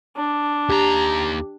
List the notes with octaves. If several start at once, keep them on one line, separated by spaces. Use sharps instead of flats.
D4
D#2 G4 A#5